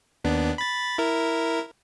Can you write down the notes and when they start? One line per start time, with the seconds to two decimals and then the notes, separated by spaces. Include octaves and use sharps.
0.24 D#2 B3 D4
0.58 B5 A6
0.98 E4 A#4